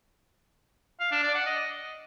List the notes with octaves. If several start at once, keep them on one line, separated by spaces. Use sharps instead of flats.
F5
D4
D5
F#5
D#5